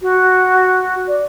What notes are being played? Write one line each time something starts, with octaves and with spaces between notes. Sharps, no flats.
F#4
D5